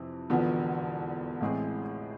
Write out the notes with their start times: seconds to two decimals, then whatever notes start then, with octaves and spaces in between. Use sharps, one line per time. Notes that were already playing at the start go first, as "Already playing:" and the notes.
Already playing: F2 C3 E3
0.30 E1 E2 D3 F3 B3
1.41 A1 A2 G#3 C4 G#4